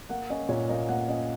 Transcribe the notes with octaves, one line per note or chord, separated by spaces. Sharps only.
A#3 F#5
C#4 D#5
A#2 C#5
A#3 D#5
A#3 F#5
C#4 D#5